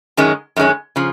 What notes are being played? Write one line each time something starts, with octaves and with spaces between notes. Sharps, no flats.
F#2 D#3 G#3 C#4
F#2 D#3 G#3 C#4
C#3 F3